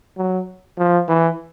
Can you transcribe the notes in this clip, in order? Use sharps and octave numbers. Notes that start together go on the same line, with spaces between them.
F#3
F3
E3